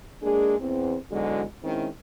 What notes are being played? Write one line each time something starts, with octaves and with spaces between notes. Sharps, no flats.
G#3 A#3 D4 G#4
E2 C4
E2 G#2 D3 F#3 G#3 F#4
D#3 G#3 C4 C#4 E4